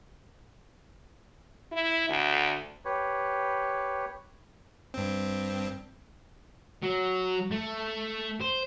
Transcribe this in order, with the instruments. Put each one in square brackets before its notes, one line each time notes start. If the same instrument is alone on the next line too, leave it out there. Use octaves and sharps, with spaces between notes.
[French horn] E4
D2
[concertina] G4 B4 C#5
[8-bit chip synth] G2 C4
[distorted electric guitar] F#3
A3
C5